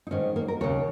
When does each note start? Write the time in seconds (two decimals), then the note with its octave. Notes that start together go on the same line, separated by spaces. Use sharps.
0.07 D#4
0.11 G#2 D#3 C#4
0.36 A#3
0.48 A#4
0.61 D#2 C#3 C#5